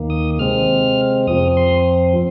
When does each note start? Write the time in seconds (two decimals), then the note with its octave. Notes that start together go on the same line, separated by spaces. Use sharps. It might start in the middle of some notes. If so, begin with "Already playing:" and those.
Already playing: D#2 D#3 A#3
0.10 D#6
0.39 C3 G#3 C4 F6
1.27 F2 F3 C4 D#6
1.57 C6